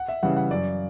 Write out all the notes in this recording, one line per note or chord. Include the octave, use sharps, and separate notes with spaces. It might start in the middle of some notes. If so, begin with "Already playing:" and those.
Already playing: F#5
E5
C#3 E3 G3 F#5
F#5
F#2 D5